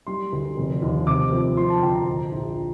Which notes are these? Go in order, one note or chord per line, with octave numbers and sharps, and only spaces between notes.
G3 C6
D2
F1
D#2
C3 D6
F2
F3 C6
A5
D2 G5
A#5
A#2
A#1